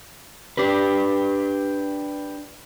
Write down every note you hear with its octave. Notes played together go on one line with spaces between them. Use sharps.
D4 G4 B4